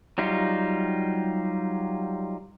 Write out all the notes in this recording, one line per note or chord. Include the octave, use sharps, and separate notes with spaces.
F#3 G3 D#4 F4